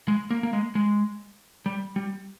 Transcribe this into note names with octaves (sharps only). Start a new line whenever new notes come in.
G#3
A#3
A#3
G#3
G#3
G3
G3